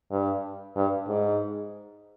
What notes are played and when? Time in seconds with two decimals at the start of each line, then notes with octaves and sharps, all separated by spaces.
0.11 G2
0.76 G2
1.08 G#2